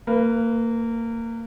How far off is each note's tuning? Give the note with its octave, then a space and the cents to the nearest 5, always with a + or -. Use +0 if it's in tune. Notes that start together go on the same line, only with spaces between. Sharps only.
A#3 -25 B4 +0